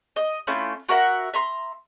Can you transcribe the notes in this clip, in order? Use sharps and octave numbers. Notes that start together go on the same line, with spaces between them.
D#5
A3 C#4 E4 F4
F#4 A#4 E5 F#5
E5 A#5 C6